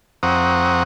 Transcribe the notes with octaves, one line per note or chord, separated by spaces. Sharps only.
F2 C4 F#5 A#5 C#6 D#6